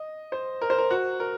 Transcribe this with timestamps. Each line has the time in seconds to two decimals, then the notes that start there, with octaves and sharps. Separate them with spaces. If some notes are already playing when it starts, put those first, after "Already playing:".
Already playing: D#5
0.32 C5
0.62 A#4
0.70 C5
0.78 A#4
0.91 F#4
1.20 A#4